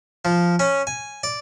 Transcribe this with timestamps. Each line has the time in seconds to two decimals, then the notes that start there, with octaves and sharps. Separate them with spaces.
0.25 F3
0.59 C#4
0.87 G#5
1.23 D5